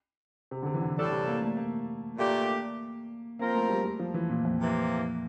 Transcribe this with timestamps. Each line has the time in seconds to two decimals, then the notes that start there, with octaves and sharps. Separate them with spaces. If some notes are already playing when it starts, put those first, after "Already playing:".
0.51 C3
0.62 D3
0.66 C3
0.74 E3
0.81 D3
0.97 A2 E3 G3 D4 A4
1.12 C3
1.28 A#3
1.42 A3
1.57 A#3
2.18 A#2 A3 A#3 D4 G4
3.39 F3 A#3 C4 F4 A#4
3.55 A3
3.69 G3
3.84 G3
3.99 F3
4.14 E3
4.29 A#2
4.45 F2
4.60 C3 E3 A#3